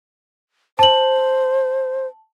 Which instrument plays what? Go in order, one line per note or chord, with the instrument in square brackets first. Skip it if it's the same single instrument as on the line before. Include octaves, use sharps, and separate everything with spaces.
[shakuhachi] C5 [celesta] A5 F#7